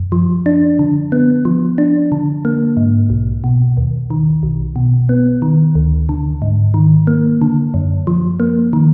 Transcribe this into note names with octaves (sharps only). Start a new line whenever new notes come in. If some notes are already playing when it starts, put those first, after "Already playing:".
Already playing: F#2
F3
D4
D3
B3
F3
D4
D3
A#3
G#2
B1
B2
D#2
D#3
B1
B2
B3
D#3
D2
D3
G#2
D#3
A#3
D3
F#2
F3
A#3
D#3